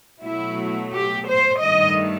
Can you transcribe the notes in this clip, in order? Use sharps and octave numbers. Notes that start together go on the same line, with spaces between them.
B2 F#3 A3 E4
G4
C5
G2 D#3 A3 D#5